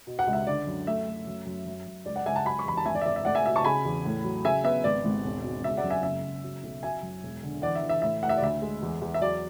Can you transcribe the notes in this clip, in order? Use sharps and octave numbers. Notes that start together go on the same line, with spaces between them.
B2
F#5
C#2
E5
D3 D5
F#2
A3 E5
A3
F#2
F#2
F#2
F#2
C#2 D5
D5 F#5
C#2 E5 G#5
F#5 A5
F#3 G#5 B5
C#6
E2 B5
A5
G#1 E5 G#5
D5
E5
G#1 D5
E5
A3 D5 F#5
E5 G#5
B2 E5
A5 C#6
C#3 G#5 B5
E2
A2
F#3
C#3 E5 G#5
B3 E5
G#1 D5
G#1
E1
B2
C#3 E5
D5 F#5
F#2
E5 G#5
F#1 E5
F#1
F#3
B1
F#3 E5 G#5
F#2
E1
D3
E3 D5 F#5
E5
E3
E5
A2 E5
A2 F#5
E5
D5
D2 E5
G#3
E2
E2
E5
F#3 D5